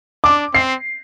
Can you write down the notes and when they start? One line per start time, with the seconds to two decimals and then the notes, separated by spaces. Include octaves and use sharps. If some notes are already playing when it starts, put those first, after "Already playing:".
0.24 D4 D6
0.54 C4 C7